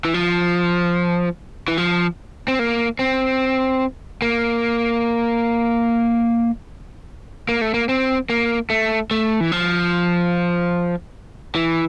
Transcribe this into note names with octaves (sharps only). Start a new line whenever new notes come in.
E3
F3
E3
F3
C4
A#3
C4
A#3
A#3
A3
A#3
C4
A#3
A3
A3
E3
F3
E3